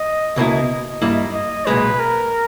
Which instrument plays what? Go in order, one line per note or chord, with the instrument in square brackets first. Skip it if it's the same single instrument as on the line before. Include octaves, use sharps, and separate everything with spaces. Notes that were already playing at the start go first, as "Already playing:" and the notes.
Already playing: [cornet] D#5
[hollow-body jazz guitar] C#2 B2 A#3 E4 [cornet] D#5
[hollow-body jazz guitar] G2 G3 A#3 E4
[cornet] D#5
[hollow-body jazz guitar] B1 A#2 G#3 [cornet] B4
[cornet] A#4